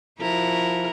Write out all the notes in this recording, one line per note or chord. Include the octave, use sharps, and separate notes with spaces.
F3 E4 F#4 A#4